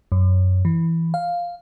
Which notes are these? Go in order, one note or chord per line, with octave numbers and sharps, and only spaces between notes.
F#2
E3
F5